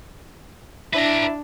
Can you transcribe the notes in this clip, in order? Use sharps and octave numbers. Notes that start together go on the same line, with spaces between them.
D4 E4 B4 A#5